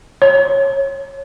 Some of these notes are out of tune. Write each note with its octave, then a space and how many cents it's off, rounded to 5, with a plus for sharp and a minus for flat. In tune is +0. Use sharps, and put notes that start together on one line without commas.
C#5 -15